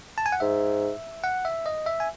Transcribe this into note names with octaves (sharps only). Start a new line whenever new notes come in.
A5
G#5
F#5
G#2 E5
F#5
E5
D#5
E5
G#5